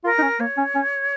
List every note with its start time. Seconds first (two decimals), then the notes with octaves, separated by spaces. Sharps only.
0.04 F4 A#4
0.18 D#4
0.22 C#4
0.40 A#3 C#5
0.57 C#4
0.75 C#4